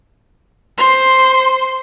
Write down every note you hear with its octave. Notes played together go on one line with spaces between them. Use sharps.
C5 C6